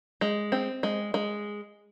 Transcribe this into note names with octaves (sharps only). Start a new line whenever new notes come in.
G#3
C4
G#3
G#3